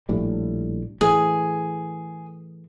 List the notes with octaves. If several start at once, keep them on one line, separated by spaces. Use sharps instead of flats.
A#1 A2 G3
A2 E3 G#3 G#4